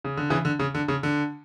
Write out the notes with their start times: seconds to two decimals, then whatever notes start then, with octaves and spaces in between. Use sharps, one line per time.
0.05 C#3
0.17 D3
0.30 C#3 E3
0.45 D3
0.59 C#3
0.75 D3
0.88 C#3
1.03 D3